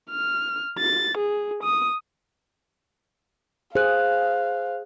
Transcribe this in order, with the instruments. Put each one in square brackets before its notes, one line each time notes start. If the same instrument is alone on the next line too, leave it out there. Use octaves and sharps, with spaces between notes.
[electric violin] F6
A6
G#4
D#6
[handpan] G#4 [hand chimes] C5 F#6 [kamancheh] F5